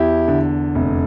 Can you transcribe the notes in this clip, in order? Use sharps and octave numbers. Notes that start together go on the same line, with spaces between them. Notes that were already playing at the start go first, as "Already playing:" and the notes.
Already playing: E2 E4 G4
D3
F1